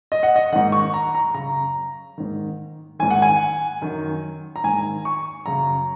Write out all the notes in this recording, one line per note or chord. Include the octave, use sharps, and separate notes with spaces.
D#5
F#5
D#5
G#2 D#3 F#5
C#6
A#5
A#5
F#2 C#3 A#5
G#2 D#3
G#2 D#3 G#5
F#5
G#5
F#2 D#3
A#5
G#2 D#3 G#5
C#6
F#2 C#3 A#5